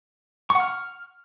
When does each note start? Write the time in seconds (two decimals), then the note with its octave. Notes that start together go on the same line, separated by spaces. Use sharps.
0.50 C#6
0.55 F#5
0.60 F6